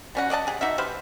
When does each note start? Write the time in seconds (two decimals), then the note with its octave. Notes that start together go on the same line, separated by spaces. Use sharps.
0.15 G3 C#4 F#4
0.30 D5 D#5 F#5 A5
0.47 G4 G#4
0.61 D#4 F#4 E5
0.78 G4 B4 C5 F5